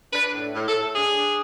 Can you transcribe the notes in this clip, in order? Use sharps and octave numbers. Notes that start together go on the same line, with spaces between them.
D4 B4
A2
A2
A4
A2
D4 G#4
D4